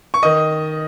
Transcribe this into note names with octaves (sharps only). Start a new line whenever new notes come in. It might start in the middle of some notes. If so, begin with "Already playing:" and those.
C#6
D#3 D#5 D#6